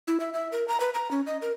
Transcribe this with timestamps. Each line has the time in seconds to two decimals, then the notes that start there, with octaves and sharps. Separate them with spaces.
0.08 E4
0.20 E5
0.34 E5
0.52 A#4
0.68 A#5
0.80 B4
0.94 A#5
1.11 C#4
1.26 D#5
1.42 A#4